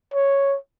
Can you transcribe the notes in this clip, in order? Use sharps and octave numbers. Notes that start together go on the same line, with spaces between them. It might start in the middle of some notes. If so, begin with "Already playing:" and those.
C#5